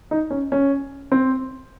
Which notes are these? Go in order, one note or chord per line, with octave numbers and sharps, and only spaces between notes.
D#4
C#4
C#4
C4